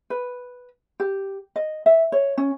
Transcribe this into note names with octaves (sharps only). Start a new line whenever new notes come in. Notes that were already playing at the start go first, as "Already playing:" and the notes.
B4
G4
D#5
E5
C#5
C#4